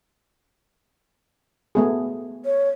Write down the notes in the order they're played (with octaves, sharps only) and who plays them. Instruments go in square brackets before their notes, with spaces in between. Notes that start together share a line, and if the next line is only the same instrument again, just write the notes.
[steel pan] A3 B3 G#4
[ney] C#5